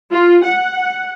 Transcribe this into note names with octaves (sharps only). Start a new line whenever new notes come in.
F4
F#5